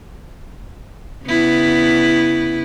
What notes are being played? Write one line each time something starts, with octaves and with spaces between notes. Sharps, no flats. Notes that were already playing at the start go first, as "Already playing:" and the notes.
C#3 B3 E4